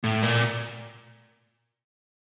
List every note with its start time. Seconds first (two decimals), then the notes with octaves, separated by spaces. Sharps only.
0.04 A2
0.23 A#2